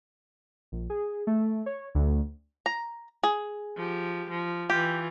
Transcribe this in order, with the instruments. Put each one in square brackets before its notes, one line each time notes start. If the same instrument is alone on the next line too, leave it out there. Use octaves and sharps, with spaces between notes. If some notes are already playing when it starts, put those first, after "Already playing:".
[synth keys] A#1
G#4
A3
C#5
D2
[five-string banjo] A#5
G#4
[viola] F3 G4
F3
[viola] E3 F4 [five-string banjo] G4